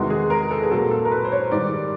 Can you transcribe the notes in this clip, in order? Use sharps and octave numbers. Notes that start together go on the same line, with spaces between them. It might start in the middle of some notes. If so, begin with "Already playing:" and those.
Already playing: E2 C3 D#3 G#3 F#4
G#4
A#4
A4
G#4
A#2 F#3 A#3 A4
A4
A#4
B4
C5
C#5
G#2 D#3 G3 D5